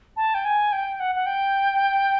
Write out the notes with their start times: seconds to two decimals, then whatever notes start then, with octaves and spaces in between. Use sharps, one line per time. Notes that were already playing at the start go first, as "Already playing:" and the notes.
0.16 A5
0.34 G5
0.45 G#5
0.72 G5
1.00 F#5
1.15 F#5
1.26 G5